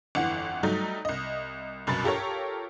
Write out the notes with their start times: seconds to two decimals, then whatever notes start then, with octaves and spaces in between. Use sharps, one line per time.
0.15 G1 F2 E3 F#5
0.63 F#3 G3 A3 D#4
1.05 C2 D#5
1.87 C2 F#2 B2 B5 A6
2.04 F4 G4 A4 A#4 C#5